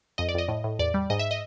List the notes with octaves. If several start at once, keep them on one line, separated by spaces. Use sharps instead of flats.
F2 D#5
D5
F2 D#5
A2
A2
E2 D5
G3
G#2 D#5
E5
D#5